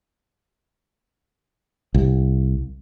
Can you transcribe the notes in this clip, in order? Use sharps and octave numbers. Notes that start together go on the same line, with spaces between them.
C2